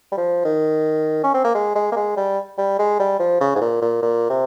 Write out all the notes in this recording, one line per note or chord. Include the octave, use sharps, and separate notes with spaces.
G3
F3
D#3
C#4
C4
A#3
G#3
G#3
A#3
G#3
G3
G3
G#3
G3
F3
C#3
G#2
A#2
A#2
A#2
C3